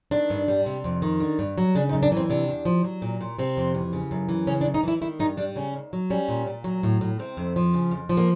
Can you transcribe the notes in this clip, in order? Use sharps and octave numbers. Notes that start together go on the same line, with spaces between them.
D#3 D4
G2
G3
C3
F2
D#3
D3
G2
F#3
C#3 D4
D#4
F#2
D4
E3 C4
C3 D4
E2
F3
F#3
A#2
A#2
C3 C4
F2
E3
C#3
F#2
E3
C#3 C#4
D4
F#2
D#4
E3 E4
D#3 E4
G2 D#4
G3 D4
C#3 C#4
D#2
F#3
G3 C#4
A#2
A#2
F#3
A2
A2
C3 C4
F2
F3
C#3
F2
F3
A#3